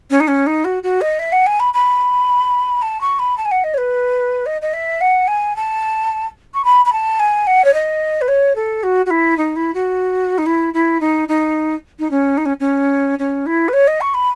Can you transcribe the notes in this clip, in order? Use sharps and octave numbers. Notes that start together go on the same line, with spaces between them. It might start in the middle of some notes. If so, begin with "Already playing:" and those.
C#4
D#4
C#4
D#4
F#4
F#4
D#5
E5
F#5
G#5
B5
B5
A5
C#6
B5
A5
G#5
F#5
D#5
C#5
B4
D#5
D#5
E5
F#5
G#5
A5
C#6
B5
B5
A5
G#5
F#5
C#5
D#5
B4
C#5
A4
F#4
F#4
E4
D#4
E4
F#4
D#4
E4
E4
D#4
D#4
D#4
C#4
D#4
C#4
C#4
C#4
E4
B4
C#5
D#5
C#6
B5